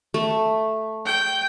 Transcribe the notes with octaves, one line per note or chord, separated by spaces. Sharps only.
A3
G5